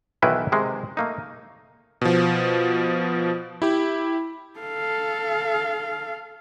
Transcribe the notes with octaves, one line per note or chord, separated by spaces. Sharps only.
B1 D#3 E3 E4 B4 E5
C3 D#3 G#3
A3 A#3 D#4
B2 F3
E4 G4
A4 F5